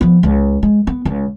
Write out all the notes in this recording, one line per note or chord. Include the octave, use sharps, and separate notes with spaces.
F3 B3
C#2
G#3
B3
C#2